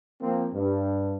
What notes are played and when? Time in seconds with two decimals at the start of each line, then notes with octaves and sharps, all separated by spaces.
0.21 F3 A#3 C4
0.53 G2